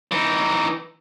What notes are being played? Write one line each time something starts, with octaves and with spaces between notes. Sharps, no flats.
E3 D#4